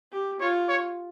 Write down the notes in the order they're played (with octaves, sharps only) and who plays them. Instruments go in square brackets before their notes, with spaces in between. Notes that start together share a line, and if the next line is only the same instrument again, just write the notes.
[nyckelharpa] G4
[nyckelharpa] F4 [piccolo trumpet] C#5
[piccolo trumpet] C#5